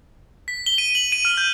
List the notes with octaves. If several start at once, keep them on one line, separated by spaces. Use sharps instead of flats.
B6
G7
D#7
F#7
D#7
F6
G6